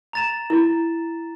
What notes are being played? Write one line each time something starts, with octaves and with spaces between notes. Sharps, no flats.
A#5 A6 E7
E4